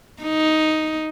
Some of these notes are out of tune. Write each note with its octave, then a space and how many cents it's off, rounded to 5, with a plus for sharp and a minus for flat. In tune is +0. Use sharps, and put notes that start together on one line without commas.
D#4 +5